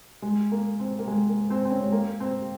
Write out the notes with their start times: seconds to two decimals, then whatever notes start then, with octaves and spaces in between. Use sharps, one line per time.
0.22 G#3
0.52 A#3
0.80 C4
0.99 A#3
1.07 G#3
1.29 A#3
1.50 C4
1.65 C4
1.71 C#4
1.83 G#3
1.92 A#3
2.20 C4